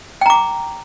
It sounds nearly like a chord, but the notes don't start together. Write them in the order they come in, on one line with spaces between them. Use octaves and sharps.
G5 A#5 D6